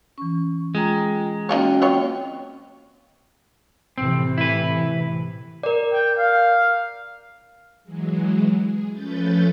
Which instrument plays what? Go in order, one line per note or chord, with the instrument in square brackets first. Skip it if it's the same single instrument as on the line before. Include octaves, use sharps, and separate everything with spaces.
[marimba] E3 C#4 [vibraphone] C#6
[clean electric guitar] G#3 [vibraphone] F4 G5 A#5
[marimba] A#3 C#4 [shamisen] D#4 F4 C#5 [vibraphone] F#4 D#5 G5
[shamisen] F#3 F4 C#5 [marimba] C4 D#5 [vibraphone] G5
[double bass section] A2 C3 E3 [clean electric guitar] C4
[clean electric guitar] E4 B4
[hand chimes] A#4 D5
[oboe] G5
F5
[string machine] E3 F#3 G#3
G#4
F3 A3 C#4 B4 G6 A6